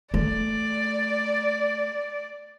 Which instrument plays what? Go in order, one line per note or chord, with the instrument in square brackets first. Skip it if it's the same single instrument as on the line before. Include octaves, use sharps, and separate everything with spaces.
[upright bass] A3 [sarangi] D5